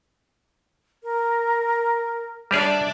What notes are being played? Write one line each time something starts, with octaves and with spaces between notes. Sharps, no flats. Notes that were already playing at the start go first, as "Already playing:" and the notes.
A#4
G3 D4 G4 G#4 D5 E5